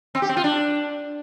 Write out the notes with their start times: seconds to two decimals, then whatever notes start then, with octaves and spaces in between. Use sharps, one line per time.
0.15 C4
0.22 G4
0.29 C4
0.37 F4
0.44 D4